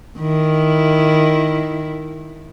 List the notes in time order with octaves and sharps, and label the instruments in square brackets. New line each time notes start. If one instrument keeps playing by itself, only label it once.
[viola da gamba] D#3 E4